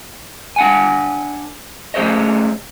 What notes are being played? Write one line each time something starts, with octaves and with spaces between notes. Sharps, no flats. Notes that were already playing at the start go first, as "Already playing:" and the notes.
D4 F#5 G#5
A3 C#4 G#4 C5 C#5 D#5